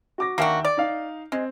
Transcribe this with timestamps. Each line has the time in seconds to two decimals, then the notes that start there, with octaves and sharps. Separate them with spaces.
0.18 F#4 D6 A#6
0.38 D#2 A#3 D4 F#4 E5 G5
0.65 D5
0.77 D#4 F5
1.32 G#3 C4